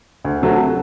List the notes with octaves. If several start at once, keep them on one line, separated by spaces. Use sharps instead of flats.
D2
C3 F#3 A3